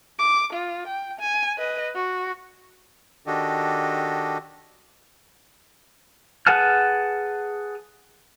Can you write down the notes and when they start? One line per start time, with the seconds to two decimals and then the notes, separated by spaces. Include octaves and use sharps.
0.19 D6
0.53 F4
0.87 G5
1.19 G#5
1.57 B4 D#5
1.95 F#4
3.27 D#3 D4 F#4 G4 A4 D#5
6.47 G#4 B4 F#5 A5 F6